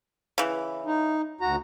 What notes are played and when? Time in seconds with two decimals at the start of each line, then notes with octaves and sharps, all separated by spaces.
0.38 C#3 E3
0.86 D#4
1.41 D2 F#4 A#5